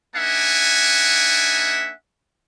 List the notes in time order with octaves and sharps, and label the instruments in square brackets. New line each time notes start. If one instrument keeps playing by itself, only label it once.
[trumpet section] A#3 D4 D#4 E5 F#5 G#5